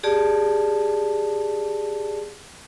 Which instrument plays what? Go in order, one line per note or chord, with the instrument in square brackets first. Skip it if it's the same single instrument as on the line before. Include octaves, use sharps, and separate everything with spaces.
[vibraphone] G4 G#4 D5 A5